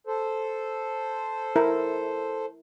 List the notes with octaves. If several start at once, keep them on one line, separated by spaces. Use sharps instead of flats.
A4 C5
E4 A#4